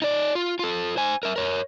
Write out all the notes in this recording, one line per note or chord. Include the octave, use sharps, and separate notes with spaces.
D#4 D5
F4
F4 A4
C5 G#5
A#4 E5
A#4 C#5